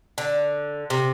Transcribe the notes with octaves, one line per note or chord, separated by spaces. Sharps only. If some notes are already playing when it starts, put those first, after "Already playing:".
D3
C3